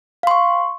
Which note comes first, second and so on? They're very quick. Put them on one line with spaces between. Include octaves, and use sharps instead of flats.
F5 C6 C#6